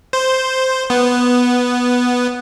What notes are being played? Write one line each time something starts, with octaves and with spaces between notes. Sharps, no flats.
C5
B3